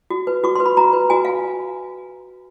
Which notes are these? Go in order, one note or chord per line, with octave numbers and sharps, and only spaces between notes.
F#4
B4
F#4 C#6
B4 C6
B5
F#4 A#5
B4
F#4 G#5
F5